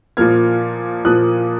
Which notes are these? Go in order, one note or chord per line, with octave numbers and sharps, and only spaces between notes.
A#2 F3 A#3 F6 G#6
A#2 F3 A#3 D#6 F#6